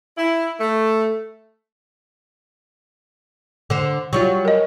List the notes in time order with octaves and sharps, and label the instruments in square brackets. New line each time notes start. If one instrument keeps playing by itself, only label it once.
[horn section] E4
A3
[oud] D3 C5
F#3 G3 F4
[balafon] A#4 D#5